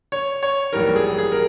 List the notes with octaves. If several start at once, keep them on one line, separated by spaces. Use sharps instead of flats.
C#5
C#5
A#1 G#2 E3 G3 A#4
G#4
G#4
A#4